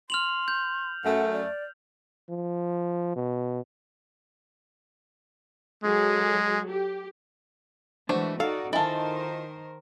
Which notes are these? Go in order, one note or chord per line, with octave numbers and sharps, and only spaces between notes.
C6 F6 F7 F#7
G6
F#2 A3 F#5
D5
F3
B2
F#3 G#3 G#4 A4
G4
E3 G#3 A3 D4 F#4 C5 A5
D#4 F#4 A4 D5 F5
D#3 E4 F4 A#4 C5 D#5 G#5 A5